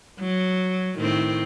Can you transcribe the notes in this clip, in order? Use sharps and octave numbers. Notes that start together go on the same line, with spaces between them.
F#3
A2 D#3 C4